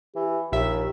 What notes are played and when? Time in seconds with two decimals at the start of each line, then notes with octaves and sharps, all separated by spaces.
0.16 E3 G4
0.52 A#1 D#2 E5